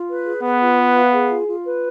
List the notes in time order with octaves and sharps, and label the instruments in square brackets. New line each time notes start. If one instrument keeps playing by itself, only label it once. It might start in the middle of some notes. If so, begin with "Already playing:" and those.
Already playing: [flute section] F4
B4
G#4
[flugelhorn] B3 [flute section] B4
[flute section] F4
B4
F5
G#4
F4
F4
B4